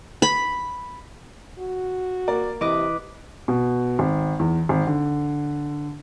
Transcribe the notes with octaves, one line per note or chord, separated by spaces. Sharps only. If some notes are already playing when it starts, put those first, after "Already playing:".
B5
F#4
A#3 A#4 D5
C3 E3 B4 D#5 D6
B2
G#1
E2
G#1
D3